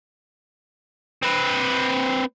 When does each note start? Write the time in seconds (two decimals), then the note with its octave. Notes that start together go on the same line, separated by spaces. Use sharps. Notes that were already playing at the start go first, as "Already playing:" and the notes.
1.22 C4 B4